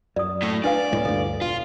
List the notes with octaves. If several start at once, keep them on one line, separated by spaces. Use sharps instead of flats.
F#2 D5 D#6
A2 A3
D4 B4 D5 F5
C#2 A2 G#3
D2 G2 A4
E1 F4